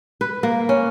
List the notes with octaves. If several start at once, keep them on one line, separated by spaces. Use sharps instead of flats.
B4
A#3
C#4